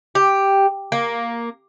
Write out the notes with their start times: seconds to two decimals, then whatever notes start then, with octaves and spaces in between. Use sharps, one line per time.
0.15 G4
0.92 A#3